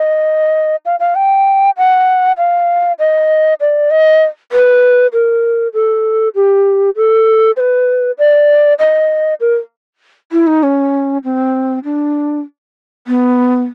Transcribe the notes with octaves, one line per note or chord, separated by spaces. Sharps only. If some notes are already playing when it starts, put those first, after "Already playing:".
Already playing: D#5
F5
F5
G5
F#5
F5
D#5
D5
D#5
B4
A#4
A4
G4
A4
C5
B4
D5
D#5
A#4
E4
D#4
C#4
C4
D4
B3